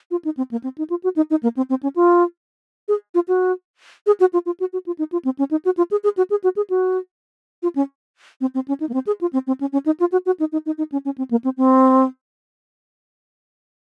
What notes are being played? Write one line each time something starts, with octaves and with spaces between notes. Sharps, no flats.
F4
D#4
C4
A#3
C4
D#4
F4
F#4
D#4
D#4
A#3
C4
C4
C#4
F4
G#4
F4
F#4
G#4
F#4
F4
F4
F#4
F#4
F4
D#4
F4
C4
C#4
D#4
F#4
F4
G#4
G#4
F#4
G#4
F#4
G#4
F#4
F4
C#4
C4
C4
C#4
D#4
A#3
C4
G#4
F4
C4
C4
C#4
C#4
D#4
F4
F#4
F#4
D#4
D#4
D#4
D#4
C#4
C#4
C4
A#3
C4
C4